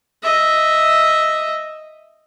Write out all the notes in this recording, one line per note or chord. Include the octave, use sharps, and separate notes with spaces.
D#5 E5